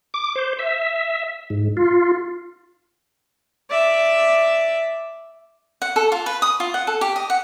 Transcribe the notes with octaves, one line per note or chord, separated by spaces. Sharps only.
D6
C5
E5
G#2
F4
D5 E5
F#5
A4
F4
B4
D#6
F4
F#5
A4
G4
D#5
F#5